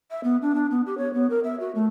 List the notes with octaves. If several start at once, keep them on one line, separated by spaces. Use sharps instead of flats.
E5
B3
D4
D4
B3
G4
C#5
B3
A#4
E5
F#4
A3